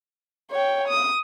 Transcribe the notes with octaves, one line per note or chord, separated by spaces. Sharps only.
C#5 G5
D#6